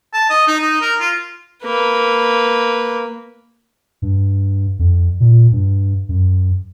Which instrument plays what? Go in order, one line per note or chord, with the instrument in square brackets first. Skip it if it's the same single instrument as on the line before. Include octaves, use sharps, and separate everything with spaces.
[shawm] A5
D#5
D#4
D#4
A#4
F4
[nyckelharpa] A#3 B4
[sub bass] G2
F2
A#2
G2
F#2